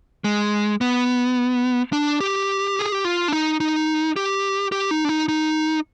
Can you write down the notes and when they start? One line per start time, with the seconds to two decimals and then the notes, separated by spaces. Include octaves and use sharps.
0.24 G#3
0.81 B3
1.93 D4
2.20 G4
2.79 G#4
2.92 G4
3.05 F4
3.28 D4
3.32 D#4
3.60 D#4
4.16 G4
4.72 G4
4.91 D#4
5.05 D4
5.09 D#4
5.29 D#4